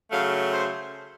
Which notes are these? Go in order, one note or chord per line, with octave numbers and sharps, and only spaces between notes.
C#3 F#3 A3 F5
C5